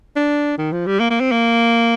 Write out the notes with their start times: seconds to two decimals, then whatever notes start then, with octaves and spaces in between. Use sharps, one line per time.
0.16 D4
0.58 D#3
0.72 F3
0.86 G3
1.00 A#3
1.10 A#3
1.21 C4
1.32 A#3